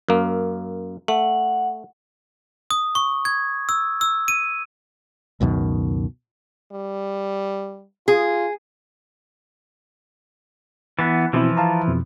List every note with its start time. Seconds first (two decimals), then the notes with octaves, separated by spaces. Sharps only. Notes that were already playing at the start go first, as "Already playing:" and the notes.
0.08 F#2 A#3
1.08 A3 F#5
2.71 D#6
2.95 C#6
3.25 G#6
3.69 E6
4.01 E6
4.28 D#7
5.41 C#2 F#2 B2 D#3
6.73 G3
8.08 F4 G#4
10.99 E3 B3 A6
11.33 B2 E3 F3 C4 E4
11.57 F5 A5 A#5
11.88 F2 B2